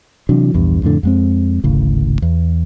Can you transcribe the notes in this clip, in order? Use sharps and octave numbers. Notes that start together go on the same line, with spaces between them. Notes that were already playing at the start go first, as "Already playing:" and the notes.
C3 E3 F#3 D4
A#1 E2 G2
F2 A2 D3
F2 G#3 C4
D1 G#1 A2 C#3
E2